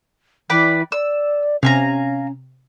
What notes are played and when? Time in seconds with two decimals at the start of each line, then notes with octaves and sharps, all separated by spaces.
0.50 E3 B4 D5 G5
0.92 D5 E6
1.63 C3 C#4 F5 G#5 A#5